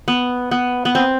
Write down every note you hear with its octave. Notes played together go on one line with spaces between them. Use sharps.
B3
B3
B3
C4